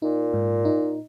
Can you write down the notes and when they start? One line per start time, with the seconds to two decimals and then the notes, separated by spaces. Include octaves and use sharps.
0.02 A#2 D#4
0.34 G#2
0.65 D#4